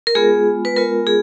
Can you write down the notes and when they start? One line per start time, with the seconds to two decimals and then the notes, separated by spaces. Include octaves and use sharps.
0.07 A#4
0.15 G#3 B3 F4 G#4
0.65 B4
0.77 G#3 B3 F4 A#4
1.07 G#4